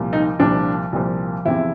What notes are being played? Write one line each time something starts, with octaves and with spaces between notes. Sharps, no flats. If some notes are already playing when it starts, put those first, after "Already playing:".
Already playing: C2 A#2 F3
D#4
C2 A#2 F3 D4
C2 A#2 F3
E2 C3 F3 E4